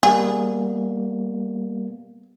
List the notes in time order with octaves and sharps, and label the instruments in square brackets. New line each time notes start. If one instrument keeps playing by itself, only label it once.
[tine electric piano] G3 A#3 B3 [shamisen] G#4